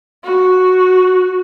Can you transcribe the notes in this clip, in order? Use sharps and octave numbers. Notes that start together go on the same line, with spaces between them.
F#4